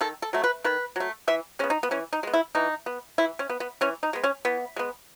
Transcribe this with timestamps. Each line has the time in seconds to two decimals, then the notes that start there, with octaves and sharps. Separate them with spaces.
0.01 D#3 A4
0.22 A4
0.33 F#3 A3
0.44 B4
0.64 D#3 B4
0.96 F#3 A3
1.28 E3 E5
1.59 G#3 B3 C#4
1.70 D#4
1.83 B3
1.91 E3 C#4
2.13 D#4
2.23 G#3 B3
2.34 E4
2.55 E3 D#4
2.86 B3
3.18 E3 E4
3.39 C#4
3.50 B3
3.60 B3
3.81 E3 C#4
4.03 D#4
4.13 G#3 B3
4.24 C#4
4.45 E3 B3
4.76 G#3 B3